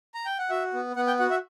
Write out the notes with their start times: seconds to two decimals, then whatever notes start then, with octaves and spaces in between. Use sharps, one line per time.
0.15 A#5
0.26 G5
0.39 F#5
0.50 F#4 E5
0.74 B3
0.96 B3 F#5
1.07 G5
1.19 F#4 F#5
1.30 E5